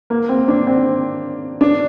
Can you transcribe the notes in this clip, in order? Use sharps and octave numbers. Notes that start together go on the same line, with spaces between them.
A#3
C4
D4
C4
D4